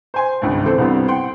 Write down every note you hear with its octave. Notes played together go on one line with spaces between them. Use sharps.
C5 G#5 C6
G#1 C#2 G2
E3 C4 A4 C5
C2 G2 G3 B3 C4
F#5 G5 C6